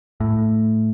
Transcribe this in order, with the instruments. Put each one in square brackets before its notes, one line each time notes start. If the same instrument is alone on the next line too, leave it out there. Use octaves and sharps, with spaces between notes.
[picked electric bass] A2